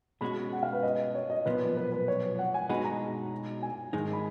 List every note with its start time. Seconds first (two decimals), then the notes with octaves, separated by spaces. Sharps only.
0.21 B2 G#3 C#4 F#4 B5
0.53 F#5
0.63 F5
0.73 B4
0.83 D#5
1.15 C#5
1.30 D#5
1.46 B1 A#2 F3 B3 B4
1.77 B4
1.92 B4
2.08 C#5
2.39 F#5
2.54 G#5
2.69 B2 G#3 D#4 F#4 B5
2.85 A#5
3.63 G#5
3.93 G#2 D#3 G#3 D#4
4.13 B5